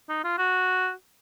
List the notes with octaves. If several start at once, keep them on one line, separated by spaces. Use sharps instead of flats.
D#4
F4
F#4